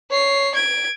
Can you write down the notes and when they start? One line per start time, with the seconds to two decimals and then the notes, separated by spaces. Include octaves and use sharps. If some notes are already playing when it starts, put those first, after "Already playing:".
0.10 C#5 C7
0.55 G#6 D7